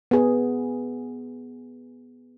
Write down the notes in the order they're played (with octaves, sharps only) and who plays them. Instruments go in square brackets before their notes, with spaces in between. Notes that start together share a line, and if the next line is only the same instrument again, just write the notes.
[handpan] B3 G#4